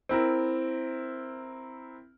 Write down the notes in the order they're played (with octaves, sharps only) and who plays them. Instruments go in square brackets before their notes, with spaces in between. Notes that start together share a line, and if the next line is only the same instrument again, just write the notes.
[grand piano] C4 E4 A#4